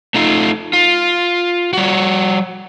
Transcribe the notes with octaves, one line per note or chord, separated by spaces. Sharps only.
A3 D#4 F4
F4
G3 F#4